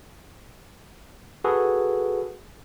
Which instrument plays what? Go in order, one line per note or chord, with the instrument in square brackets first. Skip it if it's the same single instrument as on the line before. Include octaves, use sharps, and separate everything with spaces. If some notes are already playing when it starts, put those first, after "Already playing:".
[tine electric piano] F#4 G#4 A4 B4